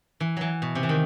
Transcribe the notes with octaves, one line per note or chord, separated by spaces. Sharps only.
E3
E3 F#3
B2
C3
E3
D#3